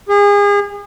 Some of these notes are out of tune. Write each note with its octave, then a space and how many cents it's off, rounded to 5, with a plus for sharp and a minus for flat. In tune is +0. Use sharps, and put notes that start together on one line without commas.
G#4 -35